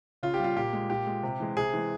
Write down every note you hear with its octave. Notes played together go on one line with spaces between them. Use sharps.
C#3 F4
G4
G3 F4
A#2 G4
G#3
A#2 G4
G#3
C3
E3 G#3
C3 G#4
E3 G#3